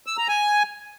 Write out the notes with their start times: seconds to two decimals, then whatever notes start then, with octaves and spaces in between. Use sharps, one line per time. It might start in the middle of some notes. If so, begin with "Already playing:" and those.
0.06 E6
0.17 A#5
0.28 G#5